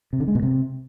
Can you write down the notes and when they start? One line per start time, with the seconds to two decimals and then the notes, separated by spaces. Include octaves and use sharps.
0.13 C3
0.20 D3
0.28 G#3
0.35 B2
0.43 C3